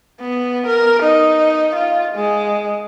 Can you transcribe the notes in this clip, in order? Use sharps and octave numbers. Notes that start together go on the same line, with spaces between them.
B3
A#4
D#4
F4
G#3